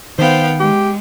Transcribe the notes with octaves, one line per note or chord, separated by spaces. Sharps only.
D#3 B3 C5 F5 G5
G#3 G4